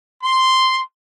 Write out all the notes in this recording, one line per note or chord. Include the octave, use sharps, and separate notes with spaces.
C6